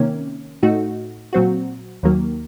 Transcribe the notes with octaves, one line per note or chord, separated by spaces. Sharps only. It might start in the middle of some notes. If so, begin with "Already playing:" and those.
Already playing: C3 D#3 A#3 C#4
A2 A3 D#4 F#4
A#2 F#3 C4 F#4
D#2 D#3 F#3 A#3